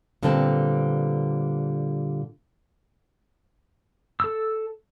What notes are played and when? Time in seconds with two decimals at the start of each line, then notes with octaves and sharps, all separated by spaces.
0.23 A#2 D3 G3 B3 C4 A4
4.20 A4 E6